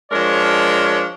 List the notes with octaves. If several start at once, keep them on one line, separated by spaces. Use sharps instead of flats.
F3 G#3 D4 A#4 C#5